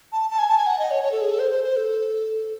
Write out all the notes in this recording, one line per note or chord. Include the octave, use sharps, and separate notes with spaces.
A5
A5
G#5
A5
G#5
F#5
D#5
C#5
C#5
A4
G#4
A4
C5
C5
C5
A4